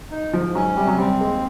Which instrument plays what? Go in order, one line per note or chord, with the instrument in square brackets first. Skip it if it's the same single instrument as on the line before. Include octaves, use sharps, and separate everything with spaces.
[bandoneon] D#4
[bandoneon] G#2 [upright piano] F3
[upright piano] F#3 [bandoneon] C#4
[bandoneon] C3 [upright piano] G3
[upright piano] F#3
[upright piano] G3 [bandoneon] C4
[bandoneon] D#2 [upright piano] G#3